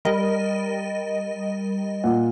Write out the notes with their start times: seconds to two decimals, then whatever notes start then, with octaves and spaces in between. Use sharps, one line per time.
0.05 G3 A#4 D#5
2.04 A#2 F#5